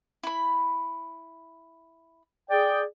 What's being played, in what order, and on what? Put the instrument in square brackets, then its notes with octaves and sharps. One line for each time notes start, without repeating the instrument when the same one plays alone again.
[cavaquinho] E4 B5
[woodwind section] G#4 D5 G5